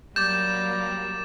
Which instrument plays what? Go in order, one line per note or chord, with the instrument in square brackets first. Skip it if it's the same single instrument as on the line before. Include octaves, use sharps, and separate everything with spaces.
[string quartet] F#3 A#3 [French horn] G3 [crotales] D6 A6 E7 [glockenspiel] G6